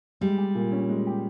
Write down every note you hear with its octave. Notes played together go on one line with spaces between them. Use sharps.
G3 G#3
G4
A#2
C#4
G#3
G4